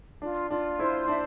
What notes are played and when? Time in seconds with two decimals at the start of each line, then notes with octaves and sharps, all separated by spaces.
0.22 D4 F4
0.50 D4 F4
0.79 E4 C5
1.08 D4 E5